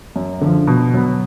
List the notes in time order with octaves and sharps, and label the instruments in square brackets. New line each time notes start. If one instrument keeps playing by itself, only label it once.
[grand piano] F#2
D3 F3
B2
F#3 B3